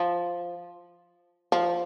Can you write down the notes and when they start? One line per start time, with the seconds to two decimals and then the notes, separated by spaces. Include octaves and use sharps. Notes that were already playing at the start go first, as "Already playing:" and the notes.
Already playing: F3
1.52 F3